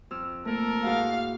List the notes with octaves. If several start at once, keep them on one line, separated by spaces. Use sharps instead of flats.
F2 E6 F6
A3 A#3 A4 A#4
G#2 E4 F#4 F5